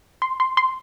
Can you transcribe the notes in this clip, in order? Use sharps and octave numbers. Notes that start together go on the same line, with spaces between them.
C6
C6
C6